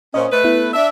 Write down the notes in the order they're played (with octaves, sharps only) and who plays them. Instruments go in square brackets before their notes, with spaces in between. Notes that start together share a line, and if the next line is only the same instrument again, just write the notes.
[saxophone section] A#2 C#4 [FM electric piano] C5 D#5
[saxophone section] A3 B4
[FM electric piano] B3 E4
[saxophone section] D4 E5